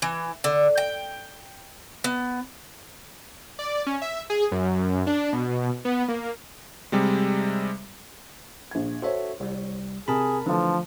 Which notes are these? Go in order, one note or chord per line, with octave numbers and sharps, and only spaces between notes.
E3
D3
G5
B3
D5
C#4
E5
G#4
F#2
D4
B2
B3
A#3
C3 G3 G#3
A#1 G#6
F#4 A4 C5 C#5 E5
C2 G3
C3 G#4 A#4 A5 B5
D3 E3 F3 A3 A5